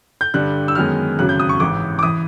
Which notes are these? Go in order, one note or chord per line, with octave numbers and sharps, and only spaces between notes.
G6
G2 D3 G3 F#6
E6
F#2 D#3 G#3 B3 F6
G#1 F#2 C#3 F#3 F#6
G6
D#6
C#6
A1 G#2 E3 D6
D6
E3 D#6